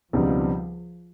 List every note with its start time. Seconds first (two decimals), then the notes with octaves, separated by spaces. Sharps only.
0.13 C#2 B2 F3 G3 C4 D#4